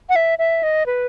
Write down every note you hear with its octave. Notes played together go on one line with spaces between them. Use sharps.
F#5
E5
E5
D#5
B4